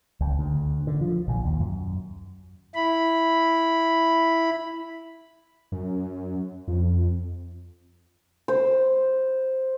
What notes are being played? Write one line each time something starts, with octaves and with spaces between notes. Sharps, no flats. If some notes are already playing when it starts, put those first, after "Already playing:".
C#2
D2
D3
F3
A#1
D#2
F#2
E4 B5
F#2
F2
C5